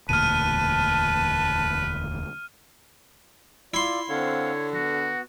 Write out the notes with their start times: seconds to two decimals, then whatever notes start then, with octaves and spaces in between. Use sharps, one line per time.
0.09 E1 D2 A#2 B4 A5 F6 D#7
3.74 E4 F4 D5 C6
4.10 D3 C4 C#5 F5 F#5
4.74 B3 F#4